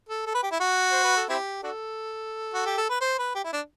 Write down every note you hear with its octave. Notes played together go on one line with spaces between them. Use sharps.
A4
A4
B4
G4
E4
F#4
C5
B4
A4
C4 E4 G4
D4 F#4 A4
F#4
G4
A4
B4
C5
B4
G4
E4
D4